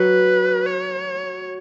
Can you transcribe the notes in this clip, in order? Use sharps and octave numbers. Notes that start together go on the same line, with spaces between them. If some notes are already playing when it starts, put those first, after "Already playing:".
Already playing: F#3 B4
C#5